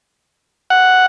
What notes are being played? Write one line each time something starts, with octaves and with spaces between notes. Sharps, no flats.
F#5